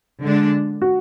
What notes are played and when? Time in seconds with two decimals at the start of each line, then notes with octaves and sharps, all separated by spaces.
0.23 D3 G#3 D4
0.82 F#4